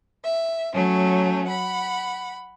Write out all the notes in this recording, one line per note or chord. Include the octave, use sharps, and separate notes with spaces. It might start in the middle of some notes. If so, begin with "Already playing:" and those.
E5
F#3 A3 C#4
F#5 B5